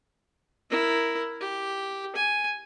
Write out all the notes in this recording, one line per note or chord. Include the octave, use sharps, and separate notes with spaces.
E4 A#4
G4
G#5